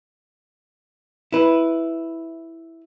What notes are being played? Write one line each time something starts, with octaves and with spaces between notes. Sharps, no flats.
E4 B4